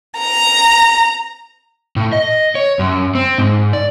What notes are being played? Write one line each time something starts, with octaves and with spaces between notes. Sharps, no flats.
A#5
A2
D#5
C#5
F#2
C4
G#2
D5